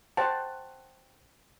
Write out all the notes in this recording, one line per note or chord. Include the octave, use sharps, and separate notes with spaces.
C5 F#5 G5 A5